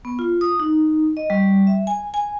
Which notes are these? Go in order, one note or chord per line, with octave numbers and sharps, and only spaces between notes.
B3
F4
D#6
D#4
D#5
G3
E5
G#5
G#5